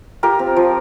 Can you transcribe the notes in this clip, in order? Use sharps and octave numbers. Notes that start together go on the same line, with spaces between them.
F4 G4 A#4
C4
F3